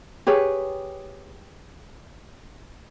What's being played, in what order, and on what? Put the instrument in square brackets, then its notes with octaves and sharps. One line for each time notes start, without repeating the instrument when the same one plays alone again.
[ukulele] G4 G#4 B4 C#5